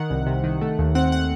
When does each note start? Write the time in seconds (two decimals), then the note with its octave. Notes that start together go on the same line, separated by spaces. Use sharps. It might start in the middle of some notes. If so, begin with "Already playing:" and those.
Already playing: D#3 F#5
0.10 C2
0.26 C3
0.44 D#3
0.61 A3
0.79 D#2
0.95 C4 F#5
1.12 F#5